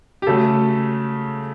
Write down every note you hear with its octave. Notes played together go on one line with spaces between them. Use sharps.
G4
C#3 F#3 A3 A4